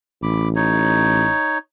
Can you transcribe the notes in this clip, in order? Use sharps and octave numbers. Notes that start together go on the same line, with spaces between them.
A1 B5 D6
D#4 C#5